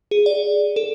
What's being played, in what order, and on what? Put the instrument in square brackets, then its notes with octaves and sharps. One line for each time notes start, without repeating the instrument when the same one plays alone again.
[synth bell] G#4
D5
A4